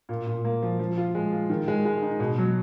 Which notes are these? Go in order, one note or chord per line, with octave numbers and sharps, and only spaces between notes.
A#2
A#2
A#3
F3
F3
F4
G#3
F4
D#3
G#3
G#3
D#4
B2
F#3